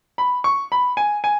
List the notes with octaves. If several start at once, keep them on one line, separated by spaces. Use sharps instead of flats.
B5
C#6
B5
G#5
G#5